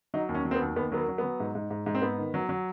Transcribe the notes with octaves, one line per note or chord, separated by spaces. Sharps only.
F#3 D#4
D#2
C#4
F#3
C4
B3
D#2
D#2 B3
F#3 B3
A#3
F#3
B3
F#3
G#2
G#2
G#2
G#2
C4
G#2 B3
D#3
F#3
F#3